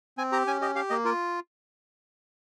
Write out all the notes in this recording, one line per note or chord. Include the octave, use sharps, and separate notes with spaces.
C4 G#5
G4 A#5
C#4 G#5
G4 D#5
G4 F5
A#3 D#5
F4 A#4